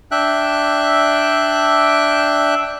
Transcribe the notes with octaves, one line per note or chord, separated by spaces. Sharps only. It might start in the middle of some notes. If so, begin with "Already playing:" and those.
D4 E5 G5 F#6